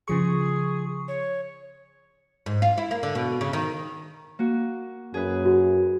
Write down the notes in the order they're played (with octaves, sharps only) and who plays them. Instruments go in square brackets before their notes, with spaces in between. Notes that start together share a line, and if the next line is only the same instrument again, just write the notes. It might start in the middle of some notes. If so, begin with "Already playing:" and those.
[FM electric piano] C#3 F3 C#6 [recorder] G#4
[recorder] C#5
[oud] G#2
F4
E4
A#3
D3
B2
C#3
D#3
[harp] A#3 F#4
[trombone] F#2 [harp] G#4 B4
[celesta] F#4